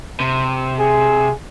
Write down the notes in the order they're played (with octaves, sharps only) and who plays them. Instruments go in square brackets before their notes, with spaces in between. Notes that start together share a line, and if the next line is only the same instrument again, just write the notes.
[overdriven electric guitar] C3
[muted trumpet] G#4